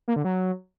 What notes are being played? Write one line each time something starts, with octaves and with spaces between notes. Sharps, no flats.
A#3
D3
F#3